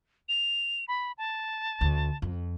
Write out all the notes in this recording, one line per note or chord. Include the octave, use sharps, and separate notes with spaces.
F7
B5
A5
D2
F2